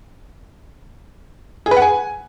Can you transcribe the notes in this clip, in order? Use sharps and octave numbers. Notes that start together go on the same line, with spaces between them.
G#4
B4
F#5
G#5